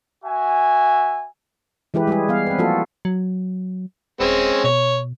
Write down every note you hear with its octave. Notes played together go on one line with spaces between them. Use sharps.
F#4 E5 G#5
E3 G#3 E4 G4 B4
G3 G#3 G4 G#4
G3 B3 F5
C4 B4
F3 A#3 C4 F4 F#4 A4
F#3
D#1 G#3 C4 C#4
B2 C#5